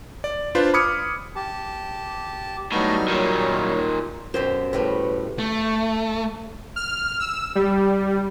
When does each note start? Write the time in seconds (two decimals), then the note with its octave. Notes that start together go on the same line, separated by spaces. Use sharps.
0.24 D5
0.55 D4 F4 B4 C5
0.74 B5 D6 D#6 F6 G#6 C#7
1.36 G4 A5
2.72 A2 F#3 G3 B3 D#4 B5 F6
3.08 A#2 D#3 C#5
4.34 F#2 B2 G4 C5
4.73 A2 G3 A3 B4
5.39 A3
6.76 F6
7.20 E6
7.55 G3